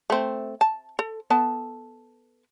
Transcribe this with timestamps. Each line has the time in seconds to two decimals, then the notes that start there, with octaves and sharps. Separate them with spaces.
0.10 A3 C4
0.61 A5
0.99 A4
1.30 B3 A4 A5